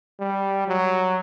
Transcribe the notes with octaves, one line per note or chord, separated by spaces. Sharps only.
G3
F#3